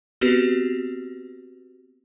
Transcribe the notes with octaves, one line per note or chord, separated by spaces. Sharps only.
B3 C4 F#4 G4 B4